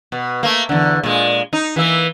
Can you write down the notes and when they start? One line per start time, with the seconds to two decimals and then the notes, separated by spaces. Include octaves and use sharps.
0.12 B2
0.43 A3 A#3
0.69 E2 D3
1.04 A#2 G#3
1.53 D#4
1.76 E3 A#3 E5